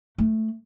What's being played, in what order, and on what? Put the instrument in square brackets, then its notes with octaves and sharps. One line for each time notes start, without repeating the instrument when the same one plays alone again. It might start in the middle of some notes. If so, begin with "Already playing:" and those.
[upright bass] A3